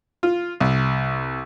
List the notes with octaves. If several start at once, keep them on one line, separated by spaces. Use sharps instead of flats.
F4
C2